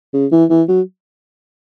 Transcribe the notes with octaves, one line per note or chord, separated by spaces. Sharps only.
C#3
E3
E3
F#3